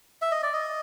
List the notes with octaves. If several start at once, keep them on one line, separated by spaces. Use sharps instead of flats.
E5
D#5
D5
D#5